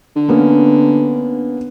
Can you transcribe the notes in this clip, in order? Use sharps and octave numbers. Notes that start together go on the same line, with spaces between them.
D3
A#3 B3 C#4